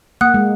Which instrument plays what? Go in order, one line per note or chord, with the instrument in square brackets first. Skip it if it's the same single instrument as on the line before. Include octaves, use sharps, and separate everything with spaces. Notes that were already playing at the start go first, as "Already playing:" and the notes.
[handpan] A#3 [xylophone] F#5 D#6 F#6
[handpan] G#3